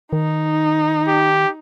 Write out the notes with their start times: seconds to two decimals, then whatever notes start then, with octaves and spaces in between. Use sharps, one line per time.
0.13 D#3 D#4
1.08 G4